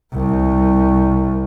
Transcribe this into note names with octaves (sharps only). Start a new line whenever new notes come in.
C2